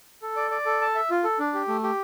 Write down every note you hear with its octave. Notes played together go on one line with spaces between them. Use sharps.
A4
D5
D5
A4
A5
E5
F4
A4
D4
G4
A3
G4